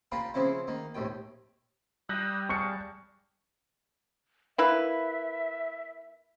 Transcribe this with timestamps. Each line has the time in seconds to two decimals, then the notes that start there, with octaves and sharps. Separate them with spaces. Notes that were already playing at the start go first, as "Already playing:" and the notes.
0.12 A#3 D4 F4 G4 A#4 B4
0.34 C#3 F3 C4 C#4 E4
0.67 D#3 A#3
0.95 A#1 D#2 A2 G5
2.09 G3 D#6 E6 F#6 G6 A#6
2.49 G#4 F5 A5 C#6 C#7
4.58 A#3 E4 B4 E5